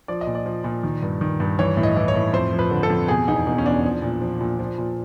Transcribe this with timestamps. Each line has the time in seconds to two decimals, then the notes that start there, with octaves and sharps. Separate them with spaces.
0.08 F3 D5
0.21 D#5
0.27 A#2
0.35 D5
0.46 F3
0.64 A#2
0.83 D#3
1.02 G2
1.21 D#3
1.40 G2
1.59 E3 C#5
1.77 A2
1.83 D#5
1.96 E3
2.08 C#5
2.15 A2
2.33 F2 C5
2.53 F3
2.59 B4
2.71 D3
2.83 A4
2.90 F2
3.08 B2 G#4
3.28 E2 D#4
3.47 B2 D#4
3.58 C#4
3.66 E2 D4
3.84 F3
4.02 A#2
4.21 F3
4.41 A#2
4.59 F3
4.78 A#2